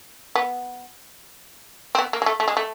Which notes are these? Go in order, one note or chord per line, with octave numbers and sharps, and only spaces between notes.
B3
C4
B3
A#3
G#3
A3
A3
G#3
A3